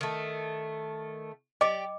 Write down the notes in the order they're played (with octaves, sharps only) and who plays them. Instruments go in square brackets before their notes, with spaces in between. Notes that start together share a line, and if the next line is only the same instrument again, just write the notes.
[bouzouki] D#3 A3
[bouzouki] G4 D5 [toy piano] D#5 G5 D6